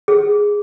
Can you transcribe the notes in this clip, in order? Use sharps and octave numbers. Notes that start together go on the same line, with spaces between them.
G#4